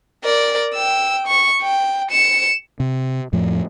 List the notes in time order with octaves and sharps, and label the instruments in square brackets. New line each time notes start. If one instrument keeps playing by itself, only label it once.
[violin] A#4 D5
G5 E6
C#6
G5
C#7 E7
[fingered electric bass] C3
F2 A2 F3